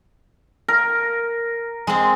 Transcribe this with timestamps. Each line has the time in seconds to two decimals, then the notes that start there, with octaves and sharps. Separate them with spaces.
0.68 A#4
1.87 G#3 C4